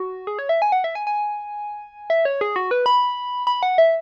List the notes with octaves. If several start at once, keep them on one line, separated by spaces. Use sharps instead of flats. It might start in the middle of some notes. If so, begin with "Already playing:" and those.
Already playing: F#4
G#4
C#5
E5
G#5
F#5
E5
G#5
G#5
E5
C#5
G#4
F#4
B4
B5
B5
F#5
E5